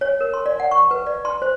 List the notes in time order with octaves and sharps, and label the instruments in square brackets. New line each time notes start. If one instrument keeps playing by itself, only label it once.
[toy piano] C#5
A#4
C6
D5
F#5
C#6
B4
D5
C6
C5